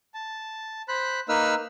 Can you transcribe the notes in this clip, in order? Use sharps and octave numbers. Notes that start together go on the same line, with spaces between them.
A5
C5 B5 F#6
A#3 D#4 B4 E6 F6